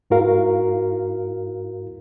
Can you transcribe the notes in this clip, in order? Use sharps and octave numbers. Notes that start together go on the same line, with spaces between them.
G#2 E4 F#4 A#4 F5